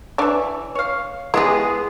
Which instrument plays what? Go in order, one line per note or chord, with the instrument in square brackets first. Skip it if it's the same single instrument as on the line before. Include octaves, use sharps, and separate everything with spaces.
[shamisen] D3 D4 D5 [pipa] E3 C#5 E5
[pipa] C#5 F5
[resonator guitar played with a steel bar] G#3 B3 G#4 [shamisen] E4 G4